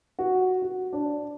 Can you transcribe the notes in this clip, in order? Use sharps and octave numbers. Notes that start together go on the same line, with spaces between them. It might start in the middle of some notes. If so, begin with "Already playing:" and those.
F#4
F#4
D4